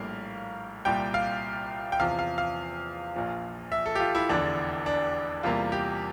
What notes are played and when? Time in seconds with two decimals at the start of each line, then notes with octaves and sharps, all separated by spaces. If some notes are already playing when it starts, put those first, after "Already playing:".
Already playing: A#1 A2 G3 A#3 F5
0.85 C2 A#2 G3 G5
1.14 F5
1.92 G5
1.99 E2 C3 F3 F5
2.19 F5
2.38 F5
3.15 A#1 A#2 F3
3.72 E5
3.86 A4
3.95 G4
4.00 F4
4.15 E4
4.29 F1 E2 D3 D4
4.86 D4
5.43 E2 C3 G3 A#3 F4
5.72 G4